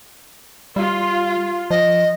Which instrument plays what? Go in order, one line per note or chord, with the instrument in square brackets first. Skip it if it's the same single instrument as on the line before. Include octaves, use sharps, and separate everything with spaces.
[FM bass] G3 [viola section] F4
[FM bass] F3 [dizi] D#5